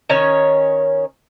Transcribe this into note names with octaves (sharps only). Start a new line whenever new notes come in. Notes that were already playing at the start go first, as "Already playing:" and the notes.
D#3 C#4 C#5